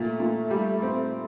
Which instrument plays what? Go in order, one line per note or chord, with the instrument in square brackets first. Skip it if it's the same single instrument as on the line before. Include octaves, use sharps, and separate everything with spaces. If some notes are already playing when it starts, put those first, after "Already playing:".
Already playing: [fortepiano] A#2 [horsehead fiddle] A3
[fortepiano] A#2
G3
C4